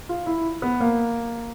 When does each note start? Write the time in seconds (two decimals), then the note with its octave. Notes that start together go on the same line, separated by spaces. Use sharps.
0.09 F4
0.26 E4
0.62 B3
0.80 A#3